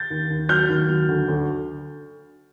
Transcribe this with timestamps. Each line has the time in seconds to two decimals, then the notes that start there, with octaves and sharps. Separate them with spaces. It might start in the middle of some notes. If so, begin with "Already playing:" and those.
Already playing: G6 A6
0.10 D#2
0.30 D#2
0.49 F#3 F6 G6
0.69 D#2
0.89 F#3
1.09 D2
1.28 D2